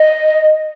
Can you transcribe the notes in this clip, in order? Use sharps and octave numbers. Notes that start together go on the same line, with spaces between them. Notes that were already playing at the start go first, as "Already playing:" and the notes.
Already playing: D#5